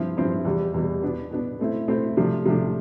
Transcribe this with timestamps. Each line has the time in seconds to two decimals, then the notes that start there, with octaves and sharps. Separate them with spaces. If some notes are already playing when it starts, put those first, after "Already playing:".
Already playing: G2 F3 C4 E4
0.17 G2 F3 C4 E4
0.45 E2 B2 G3
0.74 E2 B2 G3
1.02 B2 B3 D4
1.31 B2 B3 D4
1.59 B2 A3 C4 E4
1.88 B2 A3 C4 E4
2.17 C3 F3 A3 D4
2.45 C3 F3 A3 D4